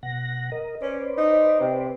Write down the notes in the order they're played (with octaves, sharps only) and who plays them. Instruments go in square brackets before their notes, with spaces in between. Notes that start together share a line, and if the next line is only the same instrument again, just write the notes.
[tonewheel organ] B2 F#5 A#6
A#4 D#5
[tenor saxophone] C#4 [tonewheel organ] B4 C5 D5
[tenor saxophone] D#4
C3